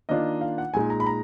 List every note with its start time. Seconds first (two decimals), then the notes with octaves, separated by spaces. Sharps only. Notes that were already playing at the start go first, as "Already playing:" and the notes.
0.09 D#3 A#3 D4 F4 D#5
0.41 F5
0.58 F#5
0.74 A#2 G#3 D#4 G#5
0.90 A#5
1.00 B5
1.07 A#5